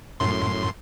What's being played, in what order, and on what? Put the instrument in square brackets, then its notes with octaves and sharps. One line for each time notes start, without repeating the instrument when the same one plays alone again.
[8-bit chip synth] F#2 A2 C6